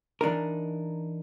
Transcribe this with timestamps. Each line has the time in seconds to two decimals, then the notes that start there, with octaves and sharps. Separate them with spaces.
0.21 E3 D4 D#4 A#4